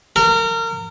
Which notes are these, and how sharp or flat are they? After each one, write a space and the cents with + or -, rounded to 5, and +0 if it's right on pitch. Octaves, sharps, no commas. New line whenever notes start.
A#4 -30